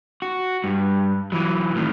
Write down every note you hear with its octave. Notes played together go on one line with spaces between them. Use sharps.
F#4
G2
E3 F#3
A2 D#3